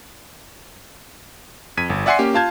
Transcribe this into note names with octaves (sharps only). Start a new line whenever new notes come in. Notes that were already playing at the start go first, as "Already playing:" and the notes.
F2 G#6 B6 D#7
G1
D5 E5 F#5 G#5 C6 C7
A#3 C#4 G4
F4 F5 A5 G6 G#6